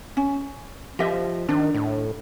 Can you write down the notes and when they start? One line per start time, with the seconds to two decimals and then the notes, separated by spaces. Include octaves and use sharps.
0.17 C#4
0.99 F3 G4 D#5 E5
1.49 D#3 D4
1.74 A2